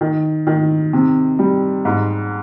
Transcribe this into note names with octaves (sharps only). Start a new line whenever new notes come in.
D#3
D#3
C3
G3
G#2